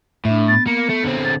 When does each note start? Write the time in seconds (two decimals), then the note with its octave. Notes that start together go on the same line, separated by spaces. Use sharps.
0.25 A2 D4 E5
0.48 B3 A6
0.67 A#3 C#7
0.90 A3
1.04 D3 C4
1.25 A6